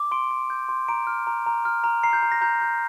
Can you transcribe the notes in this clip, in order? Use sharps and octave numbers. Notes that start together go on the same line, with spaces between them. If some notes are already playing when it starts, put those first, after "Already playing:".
Already playing: D6
C6 D7
C6
G6
C6
A#5 D7
F6
A#5
A#5
F6
A#5
A#5 C7
G6
A#5
A#6
A#5 G6
G6